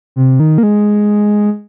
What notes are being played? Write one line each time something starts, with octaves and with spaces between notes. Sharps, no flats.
C3
D#3
A#3
G#3